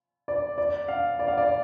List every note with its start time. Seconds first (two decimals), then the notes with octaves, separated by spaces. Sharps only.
0.28 D5
0.58 D5
0.88 F5
1.19 D5
1.28 F5
1.38 D5